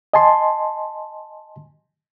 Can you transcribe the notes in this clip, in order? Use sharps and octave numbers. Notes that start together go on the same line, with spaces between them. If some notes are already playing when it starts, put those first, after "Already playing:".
D#5 G#5 A5 C6